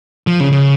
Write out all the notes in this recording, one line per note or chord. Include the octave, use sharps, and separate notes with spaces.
F3
C#3
C#3